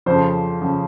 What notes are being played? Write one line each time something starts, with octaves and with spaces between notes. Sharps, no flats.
F2 C#3 F3 C5
C#3 F3